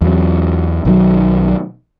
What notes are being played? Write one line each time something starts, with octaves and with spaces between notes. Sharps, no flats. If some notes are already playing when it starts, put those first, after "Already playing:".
E2 F#3
B1 D#3 F#3